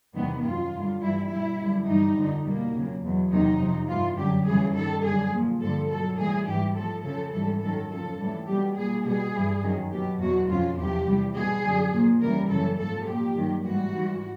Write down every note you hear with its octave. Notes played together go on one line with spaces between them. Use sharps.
E2 C3 D#3 G3 B3
F#2 D#3 F#3 F4
G2 D3 G3
G2 E3 G3 E4
B2 G3 E4
F#2 D3 G3
G2 E3 G3 D#4
F2 D3 F3
B2 G3 A#3
F2 C#3 F#3
E2 B2 F#3
E2 C3 D#3 F#3 D#4
F2 C3 F3
G2 E3 G3 F4
F#2 D3 F#3 G4
F2 C#3 E3 G3 G#4
G2 D#3 G3 A4
F#2 D3 G3 G#4
A#2 F3
G2 D3 F3 A4
B2 F#3 A4
A2 E3 G3 G#4
G#2 E3 G3 G4
A2 F3 A4
F2 C#3 F3 A4
G#2 E3 G3 A4
F#2 D#3 F#3 A4
F2 C#3 F3 A4
A2 E3 G3
B2 G3 G4
A#2 G3 G#4
B2 G3 G#4
G2 E3 G3
F#2 D#3 F#3
B2 F#3 G4
E2 B2 F#3 F#4
F2 C#3 F#3 F4
E2 C3 F3 G4
E2 C3 E3 G3
B2 G3 G#4
F#2 D3 F#3
A#2 F3
E2 C#3 E3 G3 A#4
F#2 C#3 E3 A4
G#2 F3 A4
A#2 F3 G4
G2 D#3 F#3
G#2 E3 G3 F#4
G#2 E3 G3